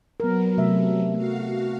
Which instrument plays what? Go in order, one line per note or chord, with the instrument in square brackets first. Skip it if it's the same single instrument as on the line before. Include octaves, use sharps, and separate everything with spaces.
[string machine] F#3 [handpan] B3 A#4
[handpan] C3 A3 E5
[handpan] A3 [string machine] F#4 F5